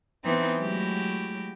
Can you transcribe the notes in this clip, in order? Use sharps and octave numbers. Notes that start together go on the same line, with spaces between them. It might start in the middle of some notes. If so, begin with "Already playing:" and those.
E3 B3 C4 D#4
F#3 G#3 A3 E4 F#4 G4